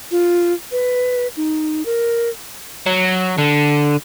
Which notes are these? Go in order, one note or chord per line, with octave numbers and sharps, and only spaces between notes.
F4
B4
D#4
A#4
F#3
D3